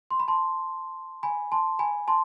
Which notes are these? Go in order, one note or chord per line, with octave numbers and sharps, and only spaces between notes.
C6
B5
A5 C6
G#5 B5
A5 C6
G#5 B5
A5 C6